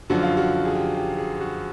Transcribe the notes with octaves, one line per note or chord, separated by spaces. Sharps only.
F#2 D3 F3 F#4
F4
F#4
G#4
G4
G4
G#4
F#4